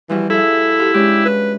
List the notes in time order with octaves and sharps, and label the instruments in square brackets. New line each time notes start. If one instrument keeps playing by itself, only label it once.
[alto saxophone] E3 [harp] F3 G3 F#4
[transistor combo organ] E4 [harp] F#4 G#4 E5 [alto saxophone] A4
[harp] F4 G4
[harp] G#3 C#4 D4 [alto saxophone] G4
[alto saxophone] B4